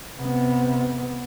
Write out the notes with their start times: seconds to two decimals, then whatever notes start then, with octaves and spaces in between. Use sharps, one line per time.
0.19 C3 B3